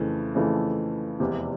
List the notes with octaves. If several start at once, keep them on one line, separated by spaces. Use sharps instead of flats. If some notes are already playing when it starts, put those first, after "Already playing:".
Already playing: F2 C#3 E3 A3
F2 C#3 E3 A3
F1 E2 C3